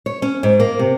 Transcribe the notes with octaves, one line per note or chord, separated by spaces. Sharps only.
C#5
C#4
G#2
A#3
C3